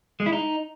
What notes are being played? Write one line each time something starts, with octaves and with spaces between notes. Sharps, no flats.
G#3
E4
D#4